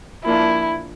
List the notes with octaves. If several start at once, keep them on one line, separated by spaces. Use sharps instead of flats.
F3 A#3 D4 E4 F4